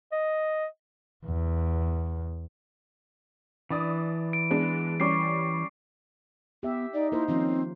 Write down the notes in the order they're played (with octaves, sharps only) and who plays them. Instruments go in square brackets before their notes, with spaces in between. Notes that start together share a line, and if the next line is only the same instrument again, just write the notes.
[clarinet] D#5
[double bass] E2
[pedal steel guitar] E3 [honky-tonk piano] D4 D5 D#6
[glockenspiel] D7
[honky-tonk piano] G#3 B3 D4
[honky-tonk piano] G3 C#4 [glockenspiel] C#6 D6 C7
[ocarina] B3 [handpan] G4 E5
[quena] D#4 [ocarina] D5
[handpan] A#3 A#4 C5 [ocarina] E4
[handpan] D#3 F3 C#4 [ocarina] C4